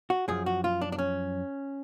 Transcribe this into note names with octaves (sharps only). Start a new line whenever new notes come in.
F#4
F#2 F3 G#4
F#4
F4
D4
D4
C#4